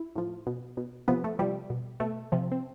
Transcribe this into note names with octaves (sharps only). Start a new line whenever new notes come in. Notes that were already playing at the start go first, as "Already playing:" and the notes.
Already playing: E4
A2 F3
B2
B2
C3 F3 B3
A3
C3 F3 G3
B2
B2 A3
C3 F3
C4